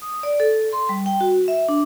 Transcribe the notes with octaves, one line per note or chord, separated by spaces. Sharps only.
D#6
D5
A4
C6
G3
G5
F#4
E5
D4